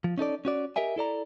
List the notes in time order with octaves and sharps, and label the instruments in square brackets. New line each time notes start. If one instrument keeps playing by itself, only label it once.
[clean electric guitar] F3
C#4 D#4 A4 D5
C#4 F#4 D5
G4 A#4 D#5 E5 G#5
E4 A4 D5 A#5